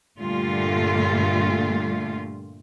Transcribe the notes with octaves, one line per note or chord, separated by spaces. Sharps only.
G2 A#2 D3 G3 A3 F4